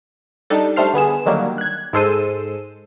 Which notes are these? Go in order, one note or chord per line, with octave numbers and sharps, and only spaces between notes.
G3 D4 D#4 A4
G3 A3 A4 C5 F6 C7
D3 B3 G#4 E7
D3 D#3 F#3 G3 A#3
F#6 G#6
G#2 G#3 A4 C5 E6 D#7